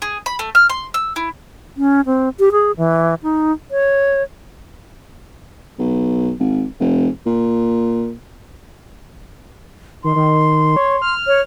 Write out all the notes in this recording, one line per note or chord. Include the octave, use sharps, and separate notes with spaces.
G#4
B5
A3
F6
C6
E6
E4
C#4
C4
G4
G#4
E3
D#4
C#5
B1
G#1
F1
A#2
D#3 C6
D#3
C#5
F6
C#5